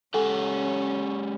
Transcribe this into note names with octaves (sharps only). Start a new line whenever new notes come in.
G#3 C#4 G4 A4 F#5 G#5